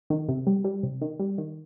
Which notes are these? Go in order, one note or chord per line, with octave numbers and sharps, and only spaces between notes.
D#3
C3
G3
G3
C3
D#3
G3
D#3